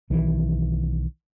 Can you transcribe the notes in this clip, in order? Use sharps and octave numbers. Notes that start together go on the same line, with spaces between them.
B1 D#3 E3